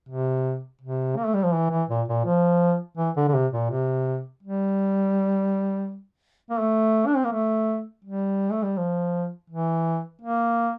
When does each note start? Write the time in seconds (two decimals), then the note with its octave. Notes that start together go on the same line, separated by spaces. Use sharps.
0.09 C3
0.81 C3
1.17 A#3
1.26 A3
1.34 G3
1.44 F3
1.54 E3
1.71 E3
1.89 A#2
2.08 A#2
2.25 F3
2.97 E3
3.16 D3
3.28 D3
3.34 C3
3.53 A#2
3.70 C3
4.43 G3
6.50 A#3
6.60 A3
7.07 D4
7.16 C4
7.24 A#3
7.32 A3
8.05 G3
8.52 A3
8.63 G3
8.78 F3
9.50 E3
10.21 A#3